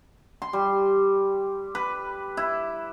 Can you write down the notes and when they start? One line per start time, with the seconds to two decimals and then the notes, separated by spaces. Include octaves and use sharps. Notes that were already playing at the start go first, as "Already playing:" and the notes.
0.42 C6
0.53 G3
1.75 B4
2.37 E4